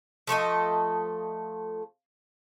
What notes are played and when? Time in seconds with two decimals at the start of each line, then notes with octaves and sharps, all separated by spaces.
0.27 F3 A3 A4 D#5